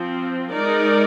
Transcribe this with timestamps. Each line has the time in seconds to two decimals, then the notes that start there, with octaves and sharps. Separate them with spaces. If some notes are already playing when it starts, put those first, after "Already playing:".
Already playing: F3 C4 F4
0.53 G#3 D#4 A#4 D5